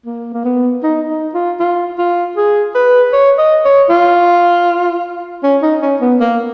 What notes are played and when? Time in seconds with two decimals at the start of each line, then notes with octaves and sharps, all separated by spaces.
0.06 A#3
0.34 A#3
0.45 B3
0.83 D#4
1.08 D#4
1.34 F4
1.60 F4
1.98 F4
2.37 G#4
2.75 B4
3.13 C#5
3.38 D#5
3.65 C#5
3.89 F4
5.43 C#4
5.62 D#4
5.82 C#4
6.01 B3
6.20 A#3